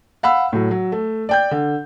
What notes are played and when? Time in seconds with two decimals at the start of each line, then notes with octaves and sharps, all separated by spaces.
0.23 F5 F#5 B5 E6
0.53 A2 F#3
0.71 F#3
0.92 A3
1.29 D5 G5 G6
1.51 D3